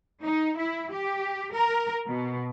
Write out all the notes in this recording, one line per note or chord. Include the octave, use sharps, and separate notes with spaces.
D#4
E4
G4
A#4
B2